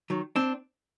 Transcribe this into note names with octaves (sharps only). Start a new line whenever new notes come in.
D#3 F#3
C4 D4